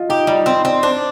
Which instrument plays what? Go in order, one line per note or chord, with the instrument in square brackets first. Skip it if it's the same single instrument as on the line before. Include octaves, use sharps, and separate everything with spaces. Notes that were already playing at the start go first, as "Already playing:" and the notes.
Already playing: [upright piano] F4 D#5
[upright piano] D#4 [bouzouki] G4
[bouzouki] G3 [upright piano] D#4
[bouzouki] C4 [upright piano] D#4
[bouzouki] C4 [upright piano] D5
[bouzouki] D4 [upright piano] C5